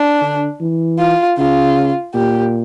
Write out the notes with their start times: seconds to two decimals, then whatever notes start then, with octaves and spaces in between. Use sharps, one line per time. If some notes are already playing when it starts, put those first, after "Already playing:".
Already playing: D4
0.22 D3
0.60 E3
0.99 F4
1.38 C#3 F4
2.15 A#2 G4